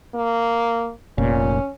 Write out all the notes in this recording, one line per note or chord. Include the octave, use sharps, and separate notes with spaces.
A#3
F1 A#2 C#4